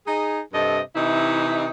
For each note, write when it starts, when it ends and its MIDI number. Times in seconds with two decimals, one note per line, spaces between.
0.07 0.40 63
0.07 0.40 68
0.53 0.80 43
0.53 0.80 48
0.53 0.80 69
0.53 0.80 75
0.95 1.70 48
0.95 1.70 52
0.95 1.70 63
0.95 1.70 64
0.95 1.70 75